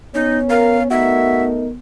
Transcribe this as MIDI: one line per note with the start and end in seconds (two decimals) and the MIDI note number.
0.14 1.79 59
0.14 0.87 61
0.14 0.38 63
0.50 0.77 70
0.50 0.83 77
0.91 1.67 57
0.91 1.67 63
0.91 1.48 66
0.91 1.67 70
0.91 1.44 76